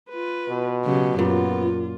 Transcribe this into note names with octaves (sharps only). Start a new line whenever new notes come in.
F4 B4
B2
C#3 F#3 G4
F#2 A#2 B3 F4